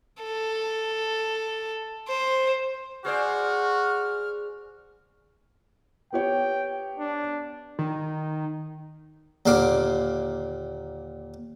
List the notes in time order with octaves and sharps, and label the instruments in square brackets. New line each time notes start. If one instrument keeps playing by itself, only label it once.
[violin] A4
C5
[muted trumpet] F#4 [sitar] G#4 C5 D5 [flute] F6
[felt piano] B3 G4 C#5 [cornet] G5
[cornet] D4
[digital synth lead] D#3
[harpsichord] D#2 A#2 D3 F5 D6